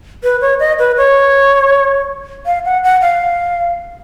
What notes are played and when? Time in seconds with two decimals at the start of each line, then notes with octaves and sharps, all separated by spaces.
0.23 B4
0.41 C#5
0.60 D#5
0.79 B4
0.97 C#5
2.46 F5
2.65 F#5
2.84 F#5
3.02 F5